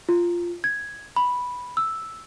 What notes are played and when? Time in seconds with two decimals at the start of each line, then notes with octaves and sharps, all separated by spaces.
0.09 F4
0.64 G#6
1.16 B5
1.77 E6